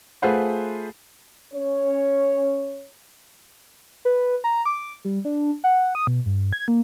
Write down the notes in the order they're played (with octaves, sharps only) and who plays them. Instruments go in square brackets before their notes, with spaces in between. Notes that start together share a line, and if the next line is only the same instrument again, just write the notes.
[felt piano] A3 F4 G#4 B4 C5 F#5
[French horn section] C#4 C#5
[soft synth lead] B4
A#5
D6
G3
D4
F#5
D#6
B2
G2
G#6
A#3